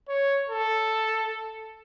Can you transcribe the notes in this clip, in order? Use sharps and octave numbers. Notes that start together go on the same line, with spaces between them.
C#5
A4